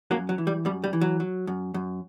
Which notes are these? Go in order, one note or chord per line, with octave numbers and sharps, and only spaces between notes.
F#2 F#3 A#3
F#3
E3
G3
F#2 G3
G3
E3
F#3
F#3
F#2
F#2